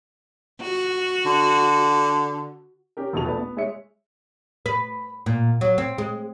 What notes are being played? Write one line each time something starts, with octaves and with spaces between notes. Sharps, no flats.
F#4
D3
C#4 G4 A#4
E1 A#1 B2 A5 F7
A3 B3 B4 D5 A5
B3
G#3 C#5 E5 C#7
B4
A#2
F#3
C4
G#3